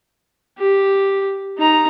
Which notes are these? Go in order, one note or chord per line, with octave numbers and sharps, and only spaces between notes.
G4
D#4 A#5